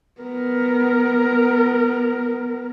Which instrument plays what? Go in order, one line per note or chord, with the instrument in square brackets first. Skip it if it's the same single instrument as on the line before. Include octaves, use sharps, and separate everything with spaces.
[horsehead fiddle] B3 A#4